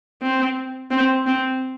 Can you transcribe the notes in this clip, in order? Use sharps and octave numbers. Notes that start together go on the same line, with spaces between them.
C4
C4
C4